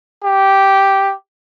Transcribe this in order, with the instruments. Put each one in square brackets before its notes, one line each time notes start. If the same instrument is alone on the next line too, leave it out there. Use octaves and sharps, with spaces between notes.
[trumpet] G4